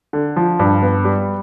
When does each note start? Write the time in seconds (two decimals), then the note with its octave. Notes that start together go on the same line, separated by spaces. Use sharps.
0.13 D3
0.36 F3
0.59 G2
0.82 B3
1.05 G3